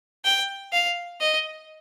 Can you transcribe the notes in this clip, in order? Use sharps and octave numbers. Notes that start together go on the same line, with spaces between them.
G5
F5
D#5